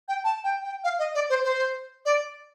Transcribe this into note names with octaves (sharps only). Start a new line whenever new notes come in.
G5
A5
G5
G5
F5
D#5
D5
C5
C5
D5